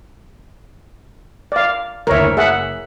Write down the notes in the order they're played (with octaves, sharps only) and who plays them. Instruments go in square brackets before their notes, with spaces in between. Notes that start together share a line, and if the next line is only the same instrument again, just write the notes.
[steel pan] D5 F5
[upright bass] F#1 D2 [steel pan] A#4 C#5 E5
[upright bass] F#1 [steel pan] G#4 E5 F#5